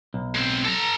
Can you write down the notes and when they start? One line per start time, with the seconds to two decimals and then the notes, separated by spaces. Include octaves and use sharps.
0.14 B1
0.35 G#3 C4
0.65 A4 A#5